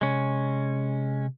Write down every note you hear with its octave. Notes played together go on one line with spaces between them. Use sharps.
C3 G#3 C#4